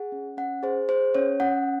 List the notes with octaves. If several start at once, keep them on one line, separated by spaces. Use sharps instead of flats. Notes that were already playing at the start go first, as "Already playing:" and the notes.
Already playing: G#4 F#5
C#4
C#4 F#5
G#4 C5
G#4 C5
C#4 C#5
C#4 F#5